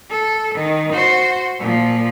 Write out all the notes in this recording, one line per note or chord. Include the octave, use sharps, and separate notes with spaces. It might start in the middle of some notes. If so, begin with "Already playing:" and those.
A4
D#3
F#4 C5
A#2 F3